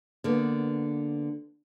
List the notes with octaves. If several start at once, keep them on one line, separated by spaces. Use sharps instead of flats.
D3 A#3 B3